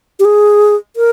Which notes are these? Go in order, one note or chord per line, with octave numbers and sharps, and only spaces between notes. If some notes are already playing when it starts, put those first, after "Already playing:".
G4
G#4
A#4